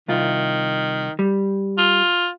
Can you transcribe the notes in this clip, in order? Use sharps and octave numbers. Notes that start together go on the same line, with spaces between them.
C2 D#3 F4
G3
F4